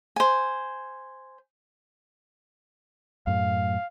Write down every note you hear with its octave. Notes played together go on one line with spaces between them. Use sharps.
C5 G#5
F#2 A2 F5